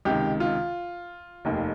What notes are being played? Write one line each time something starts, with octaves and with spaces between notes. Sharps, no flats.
C#2 C3 D#3 G4
F4
F1 D#2 D#3